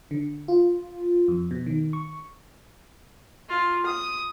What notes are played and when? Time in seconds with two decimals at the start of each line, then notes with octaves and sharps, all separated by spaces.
0.11 D3
0.48 F4
1.28 F2
1.51 B2
1.66 D#3
1.93 C#6
3.49 F4
3.86 D#6